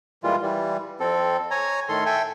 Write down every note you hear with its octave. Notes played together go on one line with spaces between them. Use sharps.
A#2 E3 G3 G#3 F4
E3 G3
F2 C4 A4
C#5 G#5 A#5
A2 D#3 A4 C6
A4 E5 G5 G#5